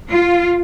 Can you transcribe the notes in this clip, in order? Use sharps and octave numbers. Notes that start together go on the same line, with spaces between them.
F4